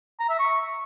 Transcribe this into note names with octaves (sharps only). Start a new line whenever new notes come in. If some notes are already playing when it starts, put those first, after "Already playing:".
A#5
E5
C#6